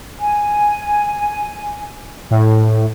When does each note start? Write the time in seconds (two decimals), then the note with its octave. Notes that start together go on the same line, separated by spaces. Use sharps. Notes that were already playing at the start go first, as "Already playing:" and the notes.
0.19 G#5
2.31 A2